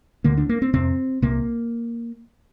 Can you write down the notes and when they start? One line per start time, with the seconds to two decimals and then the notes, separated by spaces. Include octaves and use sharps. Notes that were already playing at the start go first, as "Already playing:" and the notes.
0.24 D2 D3 A#3
0.37 D4
0.49 A#3
0.62 C4
0.74 F2 C3 C4
1.22 C2 C3 A#3